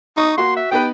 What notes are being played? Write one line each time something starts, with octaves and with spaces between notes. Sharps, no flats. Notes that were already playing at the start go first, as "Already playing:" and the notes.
D#4 C#6 D#6
A#3 F#4 C6
E5
B3 D#4 G4 B4 G5